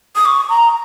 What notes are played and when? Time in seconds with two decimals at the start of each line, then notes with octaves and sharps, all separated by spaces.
0.16 D#6
0.26 C#6
0.49 A#5